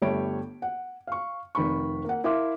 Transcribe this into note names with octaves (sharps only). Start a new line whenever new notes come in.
G1 G3 A3 C#5 B5 D7
F#5
F5 C#6
F1 D#3 B5 C#6
A#3 F#5
E4 A#4 E5 F5 C6 D6